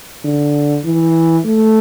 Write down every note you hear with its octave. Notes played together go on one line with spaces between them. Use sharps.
D3
E3
A3